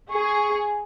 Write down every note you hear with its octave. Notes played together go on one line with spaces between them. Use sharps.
G#4 C#6